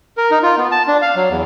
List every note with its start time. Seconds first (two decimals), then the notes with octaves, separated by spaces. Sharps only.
0.17 A#4
0.31 D#4
0.43 F4
0.57 B3
0.72 A5
0.87 D4
1.02 F5
1.16 F#3
1.30 E2